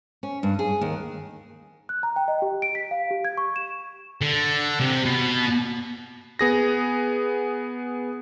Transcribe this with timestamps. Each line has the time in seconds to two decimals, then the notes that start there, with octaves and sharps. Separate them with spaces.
0.23 C#4
0.43 G2
0.59 G#4
0.81 D#2
1.89 F#6
2.03 A#5
2.16 G5
2.28 D#5
2.42 G4
2.62 D7
2.75 B6
2.91 F5
3.11 G4
3.25 G#6
3.38 C#6
3.56 E7
4.21 D3
4.80 C3
5.05 B2
6.39 B3 G#4 A#6